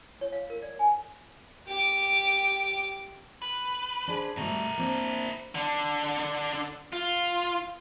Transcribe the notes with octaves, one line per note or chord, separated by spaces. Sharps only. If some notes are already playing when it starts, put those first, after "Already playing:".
C#5
F5
A#4
D5
G#5
G4 D6
B4
D4 G#4 C5
B2 G3 A3 E4 A#4
A#3 C4 D4
D3 D4
F4